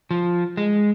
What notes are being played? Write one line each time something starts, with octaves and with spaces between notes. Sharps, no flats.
F3
G#3